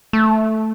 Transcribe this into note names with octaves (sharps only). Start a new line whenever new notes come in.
A3